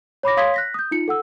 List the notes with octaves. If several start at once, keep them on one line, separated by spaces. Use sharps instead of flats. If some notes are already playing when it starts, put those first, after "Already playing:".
C#5 B5 D6 A#6
C#5 F5 C6 D#6 G#6 B6
F#6 A#6 B6
D#6 G6
D#4 F4 C#7
A4 F#5 E6